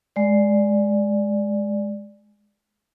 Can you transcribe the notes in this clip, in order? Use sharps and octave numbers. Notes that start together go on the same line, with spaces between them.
G#3 D5